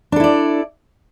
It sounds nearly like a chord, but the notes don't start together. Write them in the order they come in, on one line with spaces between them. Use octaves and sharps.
D4 A4 E4 D5